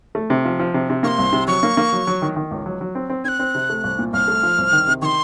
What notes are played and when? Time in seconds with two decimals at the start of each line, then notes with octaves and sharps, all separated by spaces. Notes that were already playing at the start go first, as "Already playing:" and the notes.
0.15 A3
0.30 C3
0.45 F3
0.59 F3
0.74 C3
0.90 C3
1.03 A#3 C#6
1.08 C6
1.18 C2
1.33 C3
1.47 F#3 C#6
1.63 A#3
1.77 A#3
1.92 F#3
2.07 F#3
2.22 D#3
2.36 D#3
2.51 C#2
2.66 F#3
2.81 F#3
2.95 C4
3.10 C4
3.25 C4 G#6
3.28 F#6
3.39 C4
3.55 C3
3.70 A3
3.84 C2
3.99 A#2
4.13 C2 F6
4.28 A3
4.43 F3
4.58 C2
4.73 D#3
4.87 C3
5.02 D#3 C#6
5.05 C6